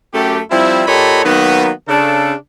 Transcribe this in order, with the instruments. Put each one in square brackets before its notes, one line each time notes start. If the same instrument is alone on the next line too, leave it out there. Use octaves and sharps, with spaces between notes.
[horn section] F#2 A3 G4
F3 G3 C4 E4
A#2 G4 A4 C#5 D#5 B5
D#3 F#3 A#3 B3
C#3 D4 A4